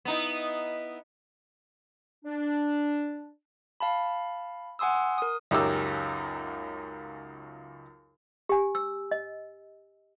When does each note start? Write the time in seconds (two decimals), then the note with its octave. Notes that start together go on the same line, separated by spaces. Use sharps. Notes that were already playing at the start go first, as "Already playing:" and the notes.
0.05 B3 D#4 E4
2.25 D4
3.80 F5 A5 B5
4.79 F#5 G#5 C6 D#6 E6
5.18 A#4 D#6
5.51 C#2 F#2 D#4 G4 D6 E6
8.49 G4 G#5
8.75 E6
9.11 D#5